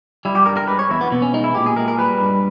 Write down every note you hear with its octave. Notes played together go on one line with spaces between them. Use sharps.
G3 E4
G4
G2 A#4
A#4
G#3 B4
C#5
E2 E4
B3
B2 B3
C#4
G#3 D#4
E4
A#2 G4
G#4
G#3 A#4
A#4
G3 B4
G2